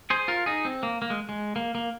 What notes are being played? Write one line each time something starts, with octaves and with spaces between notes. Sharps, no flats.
G#4 C5
F4 A#4
D#4 G#4
C4
A#3
A#3
G#3
G#3
A#3
A#3